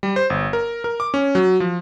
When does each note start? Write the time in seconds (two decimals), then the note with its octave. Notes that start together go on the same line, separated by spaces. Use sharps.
0.03 G3
0.16 C5
0.30 G1
0.53 A#4
0.84 A#4
1.00 D6
1.14 C#4
1.35 F#3
1.60 F3